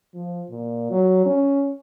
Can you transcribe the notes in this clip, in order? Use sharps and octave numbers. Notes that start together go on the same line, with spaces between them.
F3
A#2
F#3
C#4